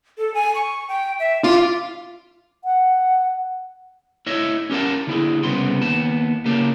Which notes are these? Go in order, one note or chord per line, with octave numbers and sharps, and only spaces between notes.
A4
G#5
C#6
G5
E5
F4 D6
F#5
E4 C#5 D#5 E5
C#4 G4 A#4 F#5 A5
D3 E4 G#4
C2 C#3 B3 C6
D#2 B3 A5
C#3 A#3 G4 A5